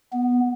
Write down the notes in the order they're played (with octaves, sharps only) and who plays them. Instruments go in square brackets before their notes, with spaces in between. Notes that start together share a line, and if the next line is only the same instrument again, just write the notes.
[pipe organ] B3